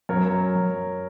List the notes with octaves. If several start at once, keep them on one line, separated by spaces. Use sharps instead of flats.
F#2 A#4 C#5
F#2